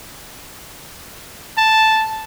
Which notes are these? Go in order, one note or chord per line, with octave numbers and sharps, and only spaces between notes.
A5